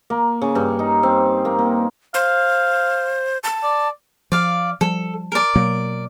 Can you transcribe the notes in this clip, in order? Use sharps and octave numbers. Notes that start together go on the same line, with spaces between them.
A#3
C#3
G2
D#4
C4
A#3
A#3
C5 F5
A5
D5
F3 D5 F5
F3 G3 A4
A#4 D5
B2 F#3 A#3